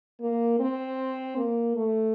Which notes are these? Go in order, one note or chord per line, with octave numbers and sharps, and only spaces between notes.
A#3
C4
A#3
A3